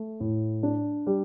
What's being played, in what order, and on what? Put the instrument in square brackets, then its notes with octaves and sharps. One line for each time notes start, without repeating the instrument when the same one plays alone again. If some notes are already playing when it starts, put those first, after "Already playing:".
Already playing: [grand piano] A3
A2
D4
G3